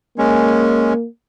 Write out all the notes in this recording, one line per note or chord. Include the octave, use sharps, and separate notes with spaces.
G#3 A#3 C#4